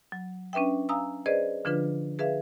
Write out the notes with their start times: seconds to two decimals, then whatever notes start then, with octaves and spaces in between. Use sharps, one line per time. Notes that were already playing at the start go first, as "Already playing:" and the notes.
0.12 F#3
0.53 C#4 D4 B4 E5 G5
0.89 F5 G#5 A#5 D#6 E6
1.26 G#4 B4 C5 D5 D#5
1.65 D3 F3 D4 F4 B4
2.19 G#4 B4 E5 F5